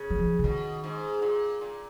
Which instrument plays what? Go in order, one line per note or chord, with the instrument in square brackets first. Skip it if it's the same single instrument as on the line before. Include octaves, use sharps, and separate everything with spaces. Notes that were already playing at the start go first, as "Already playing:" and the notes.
Already playing: [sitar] C#3
[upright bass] F#3
F3
C#3
[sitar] B2 [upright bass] D#3
[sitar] G#2
A#2
A#2